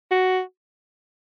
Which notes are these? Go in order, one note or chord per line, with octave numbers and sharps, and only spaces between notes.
F#4